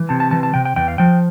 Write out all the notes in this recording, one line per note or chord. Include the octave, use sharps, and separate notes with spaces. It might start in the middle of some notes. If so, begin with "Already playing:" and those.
Already playing: E3
C3 A5
A5
E3 A5
A5
C3 G5
G5
E2 G5
F5
F3 G5